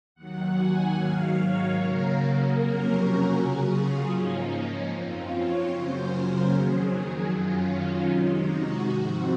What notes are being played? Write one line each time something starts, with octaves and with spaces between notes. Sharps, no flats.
D#2 D#3 F#3 F#5
G#5
G#2 D#3 F#3 F5
C#5
C#3 F#3 A#3 A#4
F2 C3 F#3 A#3 C#4
F#4
C#3 F#3 C#4 G#4
F4
G#2 F3 A#3 C#4 D#4
F#2 F3 C4 F4
C#5
F#2 C#3 F#3 A#3 C#4 C5
A#4
F2 D#3 F#3 G#4
F#2 D#3 F#3 C#4 F4
C3 D#3 G#3 D#4
F#4
G#2 F3 C4